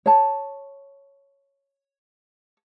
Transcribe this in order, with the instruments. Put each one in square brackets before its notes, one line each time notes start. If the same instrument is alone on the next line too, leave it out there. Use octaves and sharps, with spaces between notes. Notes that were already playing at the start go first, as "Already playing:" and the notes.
[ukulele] C#5 A5